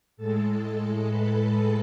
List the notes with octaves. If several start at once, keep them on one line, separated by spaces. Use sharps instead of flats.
A2 G#3 A4 A5
B4 B5